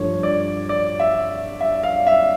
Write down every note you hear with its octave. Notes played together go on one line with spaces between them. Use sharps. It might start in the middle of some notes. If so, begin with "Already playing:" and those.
Already playing: G2 F3 A3 D4 C#5
D5
D5
E5
E5
F5
E5